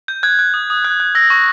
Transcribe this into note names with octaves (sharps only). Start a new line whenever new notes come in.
G6
F#6 G#6
F#6
D#6
D#6
F#6
F#6
E6 A#6
C#6